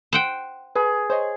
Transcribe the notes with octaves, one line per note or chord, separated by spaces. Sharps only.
C5 F#5 G5
G#4 B4
C5 C#5 D#5